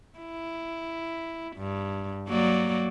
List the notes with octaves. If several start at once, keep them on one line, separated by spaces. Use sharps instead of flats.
E4
G2
F#3 A#3 D5